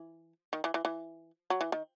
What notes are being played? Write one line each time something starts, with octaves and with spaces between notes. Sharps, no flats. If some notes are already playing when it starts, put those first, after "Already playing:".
Already playing: E3
D#3
E3
E3
E3
F#3
E3
D#3